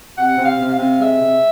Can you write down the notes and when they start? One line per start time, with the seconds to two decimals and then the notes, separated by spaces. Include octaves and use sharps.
0.17 C3 F#5
0.38 C3
0.44 F5
0.58 C3
0.72 F5
0.79 C3
0.99 G#3 E5
1.20 C3